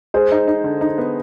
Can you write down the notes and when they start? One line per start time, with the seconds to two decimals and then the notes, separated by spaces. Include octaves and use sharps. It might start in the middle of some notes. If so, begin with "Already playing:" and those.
0.14 G#3 G#4 C5
0.32 D#4
0.48 D#4
0.64 D3
0.81 D#4
0.98 B3